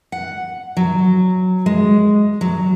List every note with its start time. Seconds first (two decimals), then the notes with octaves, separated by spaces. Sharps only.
0.12 F#5
0.77 F#3
1.66 G#3
2.41 F#3